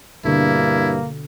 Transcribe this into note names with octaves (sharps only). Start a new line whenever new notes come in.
G2 B2 D3 A#3 E4